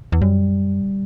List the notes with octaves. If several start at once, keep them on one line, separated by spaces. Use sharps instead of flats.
E2
F#2 G3